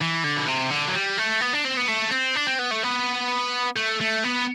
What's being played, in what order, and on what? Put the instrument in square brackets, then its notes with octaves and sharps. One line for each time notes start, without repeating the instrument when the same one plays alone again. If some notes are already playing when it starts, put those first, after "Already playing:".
[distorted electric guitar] E3
D3
B2
C3
D3
F#3
G3
A3
B3
D4
C4
B3
A3
C4
D4
C4
B3
A3
B3
A3
A3
B3